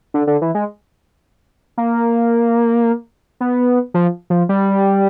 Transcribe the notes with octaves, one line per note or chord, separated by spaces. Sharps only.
D3
D3
E3
G#3
A#3
B3
F3
F3
G3